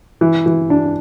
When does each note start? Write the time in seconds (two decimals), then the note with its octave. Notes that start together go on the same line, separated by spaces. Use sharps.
0.21 E3
0.46 E3
0.70 D4